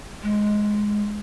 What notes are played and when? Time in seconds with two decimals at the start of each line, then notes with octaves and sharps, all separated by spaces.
0.23 G#3